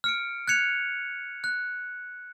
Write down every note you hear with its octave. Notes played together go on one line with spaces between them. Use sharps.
F6 C#7 D7
F#6 G#6 C#7 F7
F#6